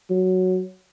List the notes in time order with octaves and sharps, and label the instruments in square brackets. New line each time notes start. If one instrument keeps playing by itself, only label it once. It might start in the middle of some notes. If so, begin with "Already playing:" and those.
[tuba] F#3